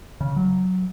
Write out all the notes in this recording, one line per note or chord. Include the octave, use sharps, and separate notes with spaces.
C#3
F#3